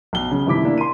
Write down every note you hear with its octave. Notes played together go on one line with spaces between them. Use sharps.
B1 G7
C#3
G1 C3 D#3 E4 D6 B6
A#3 D4 E4
C6 D#7